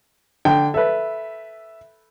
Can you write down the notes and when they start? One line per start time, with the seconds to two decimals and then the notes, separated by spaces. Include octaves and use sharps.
0.45 D3 G5
0.74 A4 B4 E5